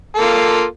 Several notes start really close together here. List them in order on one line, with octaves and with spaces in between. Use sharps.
A4 A#3 F4